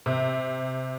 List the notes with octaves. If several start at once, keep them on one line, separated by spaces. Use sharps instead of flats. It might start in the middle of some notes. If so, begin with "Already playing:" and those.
C3